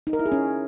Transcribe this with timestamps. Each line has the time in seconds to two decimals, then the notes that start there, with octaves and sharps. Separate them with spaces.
0.07 D#4
0.13 A#4
0.19 E4
0.25 G#4
0.32 C#4